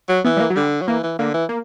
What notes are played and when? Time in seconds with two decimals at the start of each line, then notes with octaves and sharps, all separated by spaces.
0.09 F#3
0.24 E3 B3
0.37 G3
0.40 A#3
0.50 F#3
0.56 D3 G3
0.81 F#3
0.88 E3 A#3
1.03 E3
1.19 D3 A#3
1.34 E3
1.49 A#3